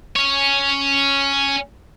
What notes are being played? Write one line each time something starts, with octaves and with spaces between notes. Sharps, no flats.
C#4 C#5